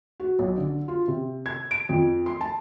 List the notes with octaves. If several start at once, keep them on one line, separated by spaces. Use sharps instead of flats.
F#4
B1
D3
F4
C3
G#6
D7
F2
C6
A5